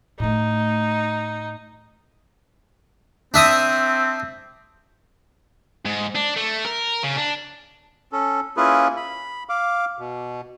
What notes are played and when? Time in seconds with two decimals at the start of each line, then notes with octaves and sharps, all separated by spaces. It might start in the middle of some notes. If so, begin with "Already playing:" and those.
0.20 A2 A3 D#4
3.34 C4 D4 E5 D#6
5.85 G#2
6.15 D4
6.37 A3
6.65 A#4
7.04 C#3
7.17 D4
8.12 C#4 A4
8.57 A#3 C#4 E4 F4 G#4 B4
8.96 B5
9.49 F5 D6
9.98 B2